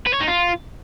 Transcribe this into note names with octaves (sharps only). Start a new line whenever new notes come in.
B4
C#5
D#4
F4